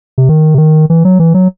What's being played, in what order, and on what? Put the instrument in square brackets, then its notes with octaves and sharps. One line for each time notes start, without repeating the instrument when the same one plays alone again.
[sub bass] C3
D#3
C3
D#3
E3
F#3
E3
F#3